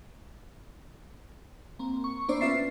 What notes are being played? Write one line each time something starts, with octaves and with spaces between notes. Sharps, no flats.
A#3 C4
C#6
A#3 B3 D4 E4 C5 D5
C#4 F4 B4 E5 A6 C7
C7